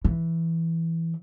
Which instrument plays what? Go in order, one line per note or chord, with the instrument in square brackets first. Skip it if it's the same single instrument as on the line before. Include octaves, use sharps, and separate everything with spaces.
[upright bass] E3